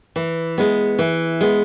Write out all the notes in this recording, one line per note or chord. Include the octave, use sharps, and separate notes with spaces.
E3
G#3 B3
E3
G#3 B3